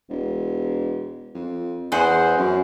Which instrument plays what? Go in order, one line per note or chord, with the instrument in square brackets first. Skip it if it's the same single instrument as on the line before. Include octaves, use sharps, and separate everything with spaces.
[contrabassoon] E1
F2
[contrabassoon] E2 [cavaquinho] G#4 C5 F#5
[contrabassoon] F#2